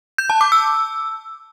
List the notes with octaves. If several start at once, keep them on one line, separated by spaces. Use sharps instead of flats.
G6
A5
D6
E6